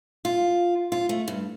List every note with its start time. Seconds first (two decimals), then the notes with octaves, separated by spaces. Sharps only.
0.25 F4
0.92 F4
1.09 A3
1.28 G2